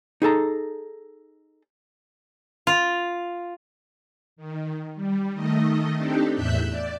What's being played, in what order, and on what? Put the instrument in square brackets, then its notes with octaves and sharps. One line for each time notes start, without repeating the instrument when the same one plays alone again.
[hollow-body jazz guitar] D#4 G#4 A4 A#5
[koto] F4
[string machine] D#3
G3
D#3 A3 D#5
C4 D4 D#4 G4 A4
E2 A2 E5 E6 F#6 G6
D5